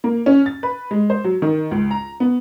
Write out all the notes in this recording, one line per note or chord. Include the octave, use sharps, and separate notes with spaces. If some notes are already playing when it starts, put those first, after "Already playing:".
A#3
C#4
A6
B4
G#3
C5
F#3
D#3
C#2
A#5
B3